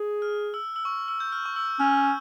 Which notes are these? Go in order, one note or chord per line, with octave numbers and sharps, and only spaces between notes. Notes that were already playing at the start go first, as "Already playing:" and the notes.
Already playing: G#4
F6
E6
E6
C#6
E6
G6
F6
C#6
E6
C#4 F6